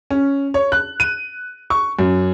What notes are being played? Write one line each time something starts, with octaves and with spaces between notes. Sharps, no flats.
C#4
C#5
F#6
D#7
C#6
F#2